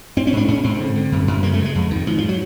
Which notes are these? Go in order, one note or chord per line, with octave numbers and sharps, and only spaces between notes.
G#2 C4
C#4
G#2 D4
G#2 C#4
G#2 C4
D3
D3
F#2
F#2
C#3 A#3
A3
C#3 G#3
F2
F2 D#3
G#2 F3
F3
F#3